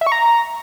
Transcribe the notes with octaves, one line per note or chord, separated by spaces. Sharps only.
E5
C#6
A#5